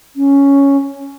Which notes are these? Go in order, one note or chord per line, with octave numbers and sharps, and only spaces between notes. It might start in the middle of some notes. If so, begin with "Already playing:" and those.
C#4